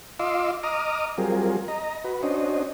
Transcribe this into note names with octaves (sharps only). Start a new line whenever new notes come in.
F4 D#5 F5 C6 D6 E6
D#5 A#5 D6 D#6 F6
F#3 G3 C4 F4 G#4 A#4
D#5 A#5
F#4 B4
C#4 D4 F#4 C5 D#5